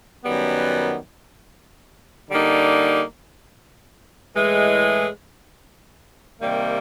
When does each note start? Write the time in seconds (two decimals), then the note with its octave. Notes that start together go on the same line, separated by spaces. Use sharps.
0.24 F#2 D#3 G3 B3
2.29 D3 G3 A#3 D#4
4.35 A2 E3 G#3
6.40 C3 D#3 G3 A#3